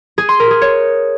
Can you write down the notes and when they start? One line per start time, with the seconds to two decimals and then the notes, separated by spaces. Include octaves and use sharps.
0.18 G#4
0.29 C6
0.40 A#4
0.51 G#4
0.61 C#5